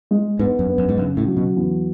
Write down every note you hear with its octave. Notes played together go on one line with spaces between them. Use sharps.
G#3
G#2 B3
F#2
B3
F#2
G#2
F#2 C#3
A2
F#3
B2
E2